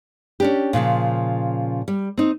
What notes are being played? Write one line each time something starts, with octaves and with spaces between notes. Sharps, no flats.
C#4 D4 G4
A#2 C#3 E3 F3
G3
C4 D#4